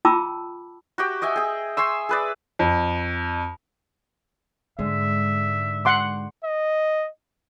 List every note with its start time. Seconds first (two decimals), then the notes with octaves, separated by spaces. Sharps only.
0.05 F4 G5 A5 B5 D6 E6
0.98 F#4 G4 G5
1.22 D#5 E5 G5 G#5
1.36 G#4 G5
1.77 G#5 C6 C#6 E6
2.09 G#4 B4 D5
2.59 F2
4.79 G#2 D3 G#3 E5
5.85 F#5 C6 D6
6.44 D#5